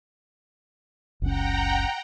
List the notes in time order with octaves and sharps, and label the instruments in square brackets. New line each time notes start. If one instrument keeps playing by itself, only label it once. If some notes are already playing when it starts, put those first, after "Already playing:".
[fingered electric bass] F#1 C#2 C#4 [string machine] F#5 G5 A#5